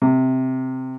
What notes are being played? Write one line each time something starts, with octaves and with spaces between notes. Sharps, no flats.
C3